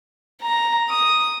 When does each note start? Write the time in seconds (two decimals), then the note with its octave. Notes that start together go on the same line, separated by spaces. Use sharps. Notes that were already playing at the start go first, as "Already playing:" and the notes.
0.42 A#5
0.90 D#6